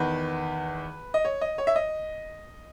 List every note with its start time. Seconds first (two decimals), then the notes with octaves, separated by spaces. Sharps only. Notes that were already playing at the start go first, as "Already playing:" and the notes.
Already playing: E2 D#3 B4
1.14 D#5
1.25 C#5
1.41 D#5
1.58 C#5
1.67 E5
1.76 D#5